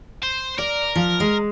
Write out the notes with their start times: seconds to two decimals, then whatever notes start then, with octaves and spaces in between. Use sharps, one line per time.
0.23 C5
0.58 A#4 D5
0.96 F3
1.20 G#3